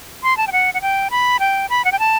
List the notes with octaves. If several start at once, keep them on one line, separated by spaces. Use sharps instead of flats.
C6
A5
G5
F#5
F#5
G5
B5
G5
B5
F#5
G5
A5